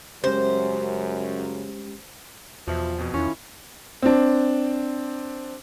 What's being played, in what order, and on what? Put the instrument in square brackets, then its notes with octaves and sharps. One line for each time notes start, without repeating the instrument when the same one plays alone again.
[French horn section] F#2 C#3 F#3 [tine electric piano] G#3 C#4 G4 [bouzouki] C5
[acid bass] E2 [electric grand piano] B2 F4 E5 [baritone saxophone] F3
[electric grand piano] F2 B2
[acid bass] E2 [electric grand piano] D#3 F4 [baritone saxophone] C#4 [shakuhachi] E4
[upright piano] C4 D4